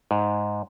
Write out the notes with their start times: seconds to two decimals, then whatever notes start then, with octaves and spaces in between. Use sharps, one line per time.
0.11 G#2